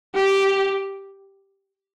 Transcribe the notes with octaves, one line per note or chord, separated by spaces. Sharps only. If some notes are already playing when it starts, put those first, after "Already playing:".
G4